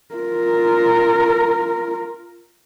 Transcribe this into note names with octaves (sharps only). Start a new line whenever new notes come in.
F4 A#4